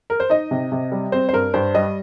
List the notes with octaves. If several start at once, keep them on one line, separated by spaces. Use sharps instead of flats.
A#4
C5
D#4 D#5
C3
C3
G3
C4 C5
C5
G2 A#4
G2 C5
G3 D#5